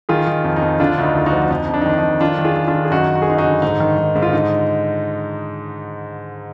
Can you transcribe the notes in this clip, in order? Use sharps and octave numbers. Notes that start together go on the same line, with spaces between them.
D#3 F4 G#4
D#3
F2
D#4
F2
D3 D4 F4
D2
D#4
D2 F4
D#4 F#4
F3
F2 D#4
F2
D4
D#4
D#3 D4
D#4
D#3
D#3 D4 F4
D#3
F4 G#4
D#3
D4 F4
D#3
G#4
F#2 D#4 F#4
F#2
F#4
G#4
F#2 D#4 F#4
D#4 F#4
D3
G#2 D#4
D#3
D#3
G#2
F4
D3 D#4